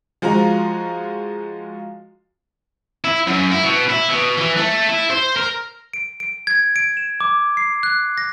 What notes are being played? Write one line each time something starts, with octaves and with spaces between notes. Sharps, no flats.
F3 G#3 F4 F#4 A#5
E4
F#2
E4
B2
E4
B2
E3
A3
E4
C5
A#4
D7
D7
G#6
D7
E7
D6
C7
F#6
A#6